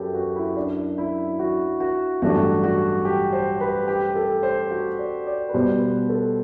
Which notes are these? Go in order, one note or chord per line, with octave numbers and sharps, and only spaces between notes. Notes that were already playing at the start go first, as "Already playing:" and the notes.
Already playing: F#2 G4 A4 B4
F#4
E4
D4
E4
F#4
F#4
A1 G2 F#3 A3 D4 F#4
F#4
G4
C5
B4
G4
A4
C5
F#4
D5
D5
B4
B2 G3 B3 C5
B4
A4